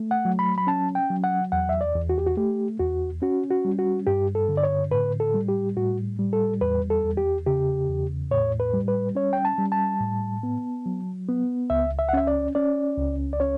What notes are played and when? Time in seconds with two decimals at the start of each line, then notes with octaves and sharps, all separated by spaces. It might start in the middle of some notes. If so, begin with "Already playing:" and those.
Already playing: A3
0.11 F#5
0.25 F#3
0.39 B5
0.58 B5
0.67 C#4 A5
0.95 G5
1.10 F#3
1.24 F#5
1.52 E2 F#5
1.69 E5
1.81 D5
1.95 E2
2.09 F#4
2.18 G4
2.27 F#4
2.37 A3 G4
2.79 E2 F#4
3.22 C#4 F#4
3.51 F#4
3.65 G3
3.79 F#4
4.07 G2 G4
4.35 A4
4.49 D3
4.57 D5
4.63 C#5
4.91 A2 B4
5.20 A4
5.34 G3
5.48 G4
5.77 A2 F#4
6.19 G3
6.33 A4
6.61 E2 B4
6.90 A4
7.04 E2
7.17 G4
7.46 C#3 G4
7.89 E2
8.31 A2 C#5
8.60 B4
8.74 G3
8.88 B4
9.15 C#4 C#5
9.33 G5
9.45 A5
9.58 G3
9.72 A5
10.01 A2
10.43 B3
10.86 F#3
11.29 B3
11.70 C#2 E5
11.99 E5
12.09 F#5
12.13 C#4 E5
12.27 D5
12.55 C#4 D5
12.98 C#2
13.33 D5
13.40 C#4 C#5